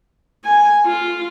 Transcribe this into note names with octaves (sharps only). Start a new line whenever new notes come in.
G#5
F4